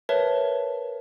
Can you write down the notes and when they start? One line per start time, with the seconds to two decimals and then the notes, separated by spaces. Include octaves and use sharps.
0.09 A#4 B4 C#5 E5 A5